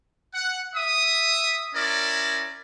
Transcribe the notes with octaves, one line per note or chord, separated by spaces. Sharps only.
F#5
E5 D#6
C#4 E4 A#4 D5